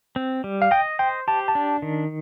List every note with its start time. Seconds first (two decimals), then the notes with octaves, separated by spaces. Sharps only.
0.16 C4
0.44 G3
0.62 F5
0.71 D#5 G5
0.99 C5 G5
1.28 G4 A5
1.48 A5
1.55 D4
1.82 D#3